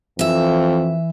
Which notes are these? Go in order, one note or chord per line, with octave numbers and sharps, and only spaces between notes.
F2 E3 E5